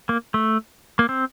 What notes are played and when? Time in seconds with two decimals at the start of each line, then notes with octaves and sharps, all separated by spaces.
0.09 A#3
0.34 A3
0.99 A#3
1.09 C4